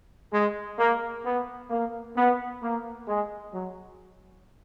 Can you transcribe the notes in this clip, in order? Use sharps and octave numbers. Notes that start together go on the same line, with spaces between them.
G#3
A#3
B3
A#3
B3
A#3
G#3
F#3